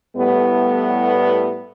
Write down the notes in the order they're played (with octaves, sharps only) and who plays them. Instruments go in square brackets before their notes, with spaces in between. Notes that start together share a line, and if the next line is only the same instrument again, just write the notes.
[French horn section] A2 G3 B3